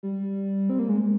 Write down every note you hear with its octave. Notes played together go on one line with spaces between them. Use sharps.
G3
C4
A#3
G#3